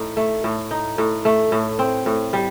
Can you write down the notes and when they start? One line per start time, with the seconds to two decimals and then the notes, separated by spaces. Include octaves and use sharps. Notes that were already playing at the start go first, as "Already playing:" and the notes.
Already playing: A2 D#4
0.17 A3
0.44 A2
0.71 D#4
0.98 A2
1.25 A3
1.52 A2
1.79 C4
2.06 A2
2.33 G3